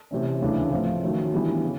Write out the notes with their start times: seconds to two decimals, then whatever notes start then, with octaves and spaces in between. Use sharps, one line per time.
0.11 C3 E3 A3 C#4
0.41 D2 C#3 E3 A3 D4
0.71 A2 F3 A3 C4 F4
1.02 D#3 F#3 A3 C#4
1.32 E3 G3 B3 D4
1.63 C#3